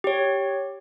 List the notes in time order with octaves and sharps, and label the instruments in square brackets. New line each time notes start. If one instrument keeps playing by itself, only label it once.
[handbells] G4 C#5